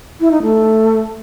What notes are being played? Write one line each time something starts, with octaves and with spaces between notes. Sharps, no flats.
E4
D#4
A3